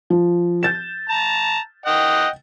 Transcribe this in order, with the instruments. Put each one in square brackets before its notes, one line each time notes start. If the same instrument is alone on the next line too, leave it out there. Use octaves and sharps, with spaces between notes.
[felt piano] F3
G6 A6 E7
[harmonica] A5 A#5
D#5 F#5 G5